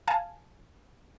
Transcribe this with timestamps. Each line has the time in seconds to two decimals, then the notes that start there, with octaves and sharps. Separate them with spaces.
0.08 F5 G#5 A5